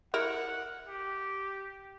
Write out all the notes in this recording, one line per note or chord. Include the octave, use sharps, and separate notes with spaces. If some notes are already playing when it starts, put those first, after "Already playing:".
E4 A#4 F#5
G4